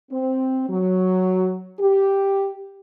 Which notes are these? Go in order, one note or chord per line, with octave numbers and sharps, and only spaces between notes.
C4
F#3
G4